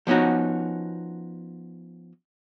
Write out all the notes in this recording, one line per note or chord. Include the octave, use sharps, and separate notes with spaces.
F3 B3 C#4 D#4 F#4